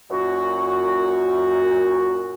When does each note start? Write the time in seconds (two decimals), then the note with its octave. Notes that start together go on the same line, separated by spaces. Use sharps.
0.10 F#2 A#2 F#4